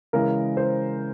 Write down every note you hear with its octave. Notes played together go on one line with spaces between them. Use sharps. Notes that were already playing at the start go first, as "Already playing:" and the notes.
C#3 E3 G#3 A#4
C5